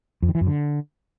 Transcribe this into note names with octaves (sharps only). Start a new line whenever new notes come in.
F2
D#3
E3
F#2
D3